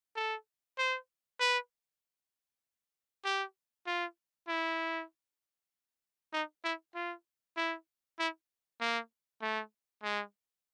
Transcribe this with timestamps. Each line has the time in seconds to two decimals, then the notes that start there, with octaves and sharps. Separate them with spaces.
0.16 A4
0.78 C5
1.40 B4
3.25 G4
3.87 F4
4.48 E4
6.33 D#4
6.64 E4
6.95 F4
7.56 E4
8.19 E4
8.81 A#3
9.42 A3
10.03 G#3